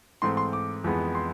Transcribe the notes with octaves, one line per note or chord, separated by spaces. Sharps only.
G#2 E3 A3 C4 C6
C6
D6
F2 E3 G#3 B3
C6